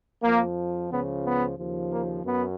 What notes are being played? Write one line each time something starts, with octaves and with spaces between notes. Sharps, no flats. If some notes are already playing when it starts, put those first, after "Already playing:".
F2 F3 A#3
C#2 C#3 F3 B3
B3
D#2 C#3 F3
A#3
F#2 B3